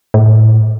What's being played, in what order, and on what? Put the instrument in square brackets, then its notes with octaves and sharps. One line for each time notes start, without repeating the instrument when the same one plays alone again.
[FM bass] A2